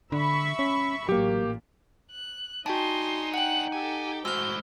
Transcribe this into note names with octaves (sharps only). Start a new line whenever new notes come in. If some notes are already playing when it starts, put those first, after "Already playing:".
D3 E5 B5 C#6
C#4
A1 A#2 F#3 A#3 G4
F#6
D4 D#4 F#4 G#4 D#5 G5 A5 C6
F#5 G5 F#6
G4 A4 G#5
A2 G#3 F#4 C5 E6 F6 G6